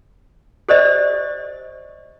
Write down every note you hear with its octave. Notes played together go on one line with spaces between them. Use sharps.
G4 C5 D5 D#5